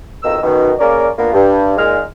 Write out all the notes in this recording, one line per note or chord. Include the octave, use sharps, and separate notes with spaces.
F2 B2 D#3 A#3 D#5 E6
F#2 B2 D#3
C#3 A#3 C#4 A#4 D5
A#3 B3 D4 F4
G2
A#2 G#3 D#4 F6